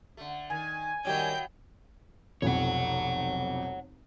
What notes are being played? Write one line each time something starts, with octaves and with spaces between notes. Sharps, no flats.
D3 A3
D#3 G#5
A2 D#3 F#3 G3 A3 C#4 G5 G6
F1 B1 F2 C#5 F#5